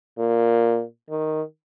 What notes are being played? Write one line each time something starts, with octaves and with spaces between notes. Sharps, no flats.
A#2
D#3